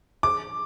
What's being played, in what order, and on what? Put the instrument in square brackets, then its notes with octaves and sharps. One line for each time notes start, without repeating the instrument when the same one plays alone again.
[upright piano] D6